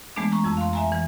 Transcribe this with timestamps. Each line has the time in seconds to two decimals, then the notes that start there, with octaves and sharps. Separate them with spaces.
0.16 E3 G#3 A3 B3 D4
0.32 A#5 C#6
0.44 F2 A5 E6
0.57 F5 C6
0.73 E5 G#5 A#5
0.92 E3